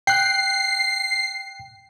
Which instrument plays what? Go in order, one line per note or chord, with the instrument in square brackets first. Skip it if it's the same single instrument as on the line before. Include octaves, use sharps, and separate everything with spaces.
[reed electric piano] G5 F#6 [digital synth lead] C7